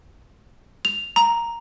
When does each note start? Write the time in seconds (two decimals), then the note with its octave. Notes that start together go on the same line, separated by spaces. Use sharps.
0.85 F7
1.16 A#5